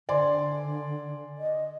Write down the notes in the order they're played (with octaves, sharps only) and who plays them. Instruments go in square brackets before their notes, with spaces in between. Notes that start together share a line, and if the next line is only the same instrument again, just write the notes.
[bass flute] D3 [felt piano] D5 G#5 C6
[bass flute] D#5